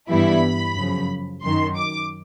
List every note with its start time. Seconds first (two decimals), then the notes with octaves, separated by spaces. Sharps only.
0.10 G2 E3 G3 B3 E4 B5
0.77 F#2 C#3 F3
1.43 F#2 D#3 F#3 C6
1.77 D6